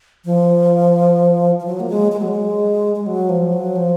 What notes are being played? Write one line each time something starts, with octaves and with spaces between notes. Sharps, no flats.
F3
F3
F#3
A#3
G#3
G#3
F#3
G#3
G#3
F#3
F3
F#3
F3